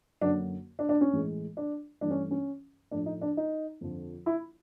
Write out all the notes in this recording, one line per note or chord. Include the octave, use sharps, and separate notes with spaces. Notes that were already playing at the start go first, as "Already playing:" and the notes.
F#2 D3 F#3 A#3 D4
D4
D4
C#4
A2 E3 G#3
D4
G2 E3 A3 D4
C#4
C#4
A2 F3 A3 D4
D#4
D4
D#4
F2 D3 F3
E4